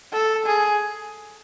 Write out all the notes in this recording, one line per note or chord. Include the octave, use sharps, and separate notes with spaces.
A4
G#4